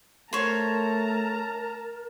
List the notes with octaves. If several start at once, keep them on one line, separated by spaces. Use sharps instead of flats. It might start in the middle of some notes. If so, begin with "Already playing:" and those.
A3 A#4 C5 C#5 A5 A#5